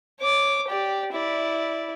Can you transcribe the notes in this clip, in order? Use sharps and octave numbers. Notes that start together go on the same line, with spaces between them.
C#5 D6
G4 D5
E4 D5